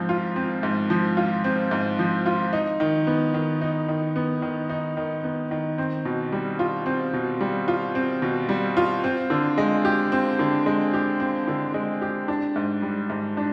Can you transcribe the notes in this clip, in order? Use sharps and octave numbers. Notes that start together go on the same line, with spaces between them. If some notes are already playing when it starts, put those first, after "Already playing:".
Already playing: G#2 F3 C4
F4
C4
G#2
F3
F4
C4
G#2
F3
F4
D#4
D#3
B3
D#3
D#4
D#3
B3
D#3
D#4
D#3
B3
D#3
C4
B2
G3
F4
C4
B2
G3
F4
C4
B2
G3
F4
C4
D3
G#3
G4
C4
D3
G#3
G4
C4
D3
G#3
G4
D4
G#2
G3
G#2
D4